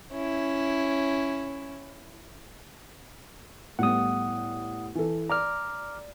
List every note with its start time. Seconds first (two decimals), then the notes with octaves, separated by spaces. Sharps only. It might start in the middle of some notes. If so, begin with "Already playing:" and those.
0.12 C#4 E4
3.79 A2 G3 B3 F#5 D#6
4.95 E3 A4
5.30 D5 A#5 D6 F6